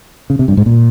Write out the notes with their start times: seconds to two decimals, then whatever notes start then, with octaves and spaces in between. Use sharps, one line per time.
0.30 C#3
0.39 C3
0.48 G2
0.57 G#2
0.66 A#2